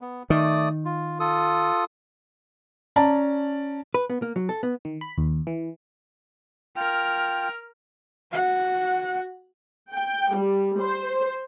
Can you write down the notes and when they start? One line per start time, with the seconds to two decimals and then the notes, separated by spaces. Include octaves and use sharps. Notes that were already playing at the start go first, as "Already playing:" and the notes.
0.01 B3
0.30 D#3 A3 D5 D#6
0.85 F4
1.20 F4 A4 D#6
2.96 C#4 D5 A5 A#5
3.94 B4
4.10 B3
4.22 A#3
4.36 F#3
4.49 A4
4.63 B3
4.85 D#3
5.01 B5
5.18 D#2
5.47 E3
6.76 F4 A#4 G5 F6
8.32 F#4 F#5
9.93 G5
10.36 G3
10.80 C5